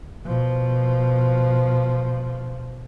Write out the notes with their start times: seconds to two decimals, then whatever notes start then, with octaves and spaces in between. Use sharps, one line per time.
0.25 B2 F3